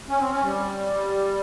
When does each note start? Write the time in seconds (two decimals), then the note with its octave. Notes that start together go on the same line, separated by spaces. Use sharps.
0.09 C#4
0.20 C4
0.31 C#4
0.43 G3